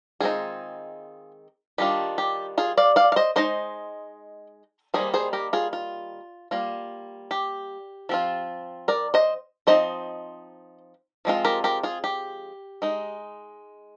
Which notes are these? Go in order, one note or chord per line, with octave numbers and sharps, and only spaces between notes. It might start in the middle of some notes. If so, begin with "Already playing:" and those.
D#3 G#3 C4 D#4 F4 G#4
D#3 G3 D4 F4 G4
G4
F4 G#4
D5 F5
D5 F5
F5
C5 D#5
G#3 D#4 C5 D#5
D#3 G3 A#3 G#4 C5
G#4 C5
G4 A#4
F4 G#4
F4
G3 A#3 F4
G4
F3 C4 F4
A#4 D5
C5 D#5
F3 C4 D#4 C5 D#5
F3 G#3 C4 F4
G4 A#4
G4 A#4
F4 G#4
G4
G#3 D#4